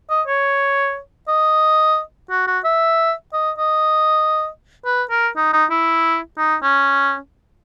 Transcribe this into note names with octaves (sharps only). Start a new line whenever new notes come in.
D#5
C#5
D#5
F#4
F#4
E5
D#5
D#5
B4
A#4
D#4
D#4
E4
D#4
C#4